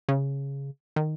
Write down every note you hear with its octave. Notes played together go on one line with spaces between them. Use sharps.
C#3
D#3